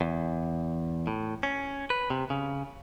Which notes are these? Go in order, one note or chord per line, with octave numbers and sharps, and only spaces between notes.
E2
A2
C#4
B4
C3
C#3